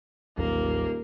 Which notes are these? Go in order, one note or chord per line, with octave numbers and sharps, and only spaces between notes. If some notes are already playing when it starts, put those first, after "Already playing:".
D#1 A1 D#2 F#3 A#3